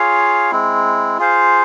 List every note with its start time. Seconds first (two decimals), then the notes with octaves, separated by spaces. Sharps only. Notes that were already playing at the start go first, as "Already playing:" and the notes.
Already playing: F4 G#4 C#5 F5
0.51 G#3 C4 E4
1.18 F4 G#4 C5 F5